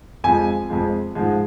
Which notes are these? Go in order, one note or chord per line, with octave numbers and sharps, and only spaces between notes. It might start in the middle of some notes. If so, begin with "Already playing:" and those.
F2 F3 G#3 G#5
F2 F3 G#3
G#2 F3 G#3